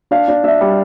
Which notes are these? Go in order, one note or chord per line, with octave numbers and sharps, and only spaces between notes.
D4 F5
D4
D4 E5
G3